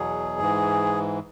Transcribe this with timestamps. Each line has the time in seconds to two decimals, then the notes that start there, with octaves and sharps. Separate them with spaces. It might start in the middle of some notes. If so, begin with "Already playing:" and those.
Already playing: E2 B2 F#3 G#4
0.40 G#2 E3